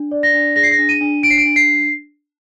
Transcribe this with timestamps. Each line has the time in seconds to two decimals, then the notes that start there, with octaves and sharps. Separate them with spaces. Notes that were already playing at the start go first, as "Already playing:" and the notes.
Already playing: D4
0.11 D5
0.23 A#6
0.34 D4
0.56 G#4 A#6
0.63 C7
0.71 A#6
0.78 D4
0.89 D#7
1.01 D4
1.23 D4 D7
1.30 C7
1.38 D7
1.45 D4
1.56 C7